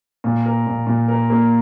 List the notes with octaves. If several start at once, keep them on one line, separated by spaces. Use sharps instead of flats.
A#2
A#4
A#2
A#2
A#4
A#3